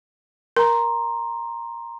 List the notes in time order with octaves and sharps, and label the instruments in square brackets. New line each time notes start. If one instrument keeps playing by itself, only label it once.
[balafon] A#4 [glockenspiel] A#5 C6